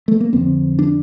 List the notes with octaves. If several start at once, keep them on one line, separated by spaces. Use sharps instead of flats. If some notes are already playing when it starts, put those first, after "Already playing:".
A3
A#3
F2 D3 C4
D4